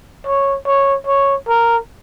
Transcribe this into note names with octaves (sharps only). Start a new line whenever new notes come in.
C#5
C#5
C#5
A#4